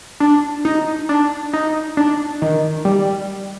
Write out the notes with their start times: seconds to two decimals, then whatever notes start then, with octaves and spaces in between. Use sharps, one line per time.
0.20 D4
0.65 D#4
1.09 D4
1.53 D#4
1.97 D4
2.42 D#3
2.85 G3